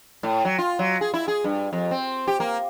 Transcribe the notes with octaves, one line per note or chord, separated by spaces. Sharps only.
A2
F#3
F4
F#3
G#4
E4
G#4
G2
F2
C4
G4
A#3